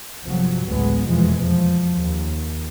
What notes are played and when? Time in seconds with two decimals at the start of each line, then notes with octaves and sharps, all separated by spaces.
0.24 G1 C3 F3 F#3
0.67 A1 D2 A2 C#3 G#3 B3
1.08 F1 E2 B2 E3 F3 G#3
1.38 F3
1.93 D#2